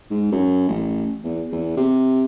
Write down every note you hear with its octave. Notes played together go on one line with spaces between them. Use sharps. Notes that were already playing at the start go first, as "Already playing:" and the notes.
G#2
F#2
A1
E2
E2
C3